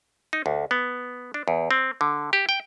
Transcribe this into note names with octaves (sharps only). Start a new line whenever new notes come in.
D#4
D2
B3
D4
E2
C4
D3
G4
G5